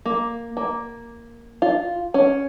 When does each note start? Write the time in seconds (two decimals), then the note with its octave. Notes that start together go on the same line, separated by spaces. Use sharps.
0.06 A#3
0.57 A#3
1.62 F4
2.14 C#4